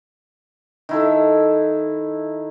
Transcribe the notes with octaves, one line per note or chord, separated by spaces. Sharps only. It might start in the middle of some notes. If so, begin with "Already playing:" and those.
D#3 E4 A4